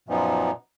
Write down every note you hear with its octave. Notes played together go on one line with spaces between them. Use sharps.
F#2 A#2 F3 B3 D#4